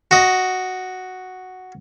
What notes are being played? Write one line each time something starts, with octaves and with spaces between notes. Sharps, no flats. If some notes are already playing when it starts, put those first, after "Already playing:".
F#4 D#5